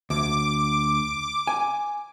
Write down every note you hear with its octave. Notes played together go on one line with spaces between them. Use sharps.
D2 D6
G#5